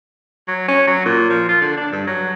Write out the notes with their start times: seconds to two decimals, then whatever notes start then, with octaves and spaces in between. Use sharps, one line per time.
0.48 F#3
0.68 C#4
0.87 F#3
1.06 A#2
1.30 F3
1.49 F4
1.61 D3
1.77 D4
1.92 G2
2.07 F#3